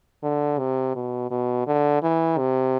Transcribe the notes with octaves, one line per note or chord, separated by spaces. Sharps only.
D3
C3
B2
B2
D3
E3
C3